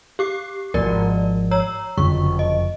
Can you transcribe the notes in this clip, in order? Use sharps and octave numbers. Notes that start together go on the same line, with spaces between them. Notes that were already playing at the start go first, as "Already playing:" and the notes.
G4 D6 C7
G#1 F3 A#4 D5
C#5 A#5 E6
F#1 F2 D3 C#6
D#5